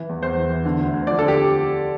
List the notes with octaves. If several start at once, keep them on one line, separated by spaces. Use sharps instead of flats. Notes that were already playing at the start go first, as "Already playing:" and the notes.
Already playing: E3
E2
E2 C5
E3
E3
D3
D2
D2
F3 D5
D3 A4
G4